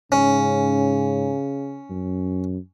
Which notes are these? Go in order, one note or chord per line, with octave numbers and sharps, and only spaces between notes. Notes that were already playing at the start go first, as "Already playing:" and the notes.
G#2 C#3 C#4
F#2